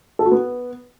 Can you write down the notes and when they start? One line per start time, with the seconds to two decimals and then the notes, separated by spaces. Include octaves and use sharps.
0.19 A4
0.25 F#4
0.32 B3